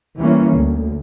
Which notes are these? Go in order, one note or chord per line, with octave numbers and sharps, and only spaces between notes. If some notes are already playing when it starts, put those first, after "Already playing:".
E3 G3 A#3 C#4
D2